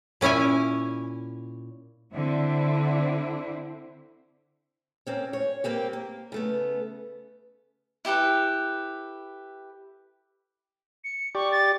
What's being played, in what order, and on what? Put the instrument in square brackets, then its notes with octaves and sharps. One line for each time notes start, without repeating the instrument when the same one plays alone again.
[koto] A#2 C#4 E4 C#5 G#5
[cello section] D3 C4 E4
[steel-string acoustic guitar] A#3 C4 C#4
C#5
G3 A#3 C4 G4
A#3
C#3 A3 B3
[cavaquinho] E4 G4 A4 B4
[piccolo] C#7
[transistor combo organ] G4 D5 [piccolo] C#6
[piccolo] A6